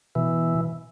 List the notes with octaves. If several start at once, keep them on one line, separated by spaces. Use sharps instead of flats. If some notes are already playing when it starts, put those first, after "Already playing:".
B2 E3